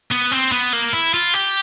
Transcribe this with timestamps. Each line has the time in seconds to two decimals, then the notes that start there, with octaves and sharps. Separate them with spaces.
0.12 B3
0.32 C4
0.52 B3
0.73 A#3
0.93 E4
1.14 F4
1.34 G4